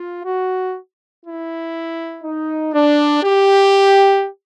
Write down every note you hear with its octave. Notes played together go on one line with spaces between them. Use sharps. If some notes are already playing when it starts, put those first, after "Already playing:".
Already playing: F4
F#4
E4
D#4
D4
G4